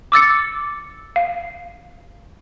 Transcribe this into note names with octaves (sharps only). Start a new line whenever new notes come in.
D6 E6 A6 C#7
F5